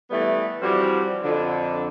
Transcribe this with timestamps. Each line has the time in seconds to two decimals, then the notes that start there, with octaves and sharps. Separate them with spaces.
0.10 E3 G3 A3 B3
0.61 E3 F3 G3 C4 F#4
1.23 F2 D3